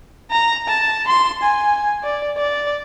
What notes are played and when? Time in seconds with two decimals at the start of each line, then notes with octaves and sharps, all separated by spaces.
0.31 A#5
0.68 A5
1.08 C6
1.42 G#5
2.03 D5
2.38 D5